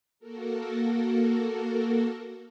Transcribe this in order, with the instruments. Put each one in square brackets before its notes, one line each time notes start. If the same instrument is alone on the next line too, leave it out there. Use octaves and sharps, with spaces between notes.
[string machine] A#3 F#4 A4 A#4